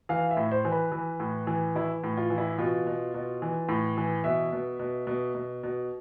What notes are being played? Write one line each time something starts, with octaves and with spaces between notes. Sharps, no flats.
E3 F5
E5
A2
C5
E3
B4
E3
A2
E3
E3 E4
A2
F4
E3
E4
B2 F4
B2
B2
E3
A2
E3
B2 E5
B2
B2
B2
B2
B2